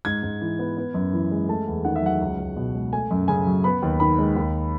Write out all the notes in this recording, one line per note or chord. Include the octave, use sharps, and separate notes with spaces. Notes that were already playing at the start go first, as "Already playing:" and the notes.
G#2 G#6
G#2
E3
B3
B3
F#2
E3
G#3
A3 A5
E2
D#3 F#5
E5
F#3 F#5
C#2
C#2
B2
G#3
A3 G#5
F#2
C#3 G#5
F#3
B3 B5
D#2
D#3 B5
G#3
D#2